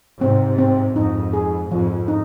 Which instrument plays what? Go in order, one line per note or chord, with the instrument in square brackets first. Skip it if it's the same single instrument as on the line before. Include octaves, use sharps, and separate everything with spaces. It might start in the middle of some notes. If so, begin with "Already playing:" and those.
[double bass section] G#2 C3 [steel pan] C4
[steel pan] C4
[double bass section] F2 G#2 [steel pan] D#4
[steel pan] G#4
[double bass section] F2 G#2 [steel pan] F3
[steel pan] D#4